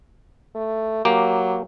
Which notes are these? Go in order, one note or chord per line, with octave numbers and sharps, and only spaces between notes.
A3
F#3 A#3 G4